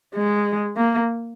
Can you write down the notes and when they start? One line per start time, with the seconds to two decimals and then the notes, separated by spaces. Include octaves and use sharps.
0.15 G#3
0.76 A#3